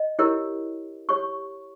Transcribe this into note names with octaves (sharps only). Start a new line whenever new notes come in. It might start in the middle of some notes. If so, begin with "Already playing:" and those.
Already playing: D#5
E4 G4 A#4 C#5
G4 C#5 C#6